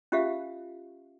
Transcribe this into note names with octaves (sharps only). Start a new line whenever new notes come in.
C#4 F4 G4 E5 F5